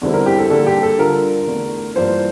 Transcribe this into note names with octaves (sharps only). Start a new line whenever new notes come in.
E2 D3 G3 C4 E4
A#4
G4
A4
D3 G3 A#3 A4
G4
A4
D3 G3 D4 F4 A#4
E2 D3 A3
G2 E3 A#3 F4 C5